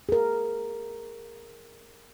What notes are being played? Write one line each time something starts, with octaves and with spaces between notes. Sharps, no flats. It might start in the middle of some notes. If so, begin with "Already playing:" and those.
G#4 A#4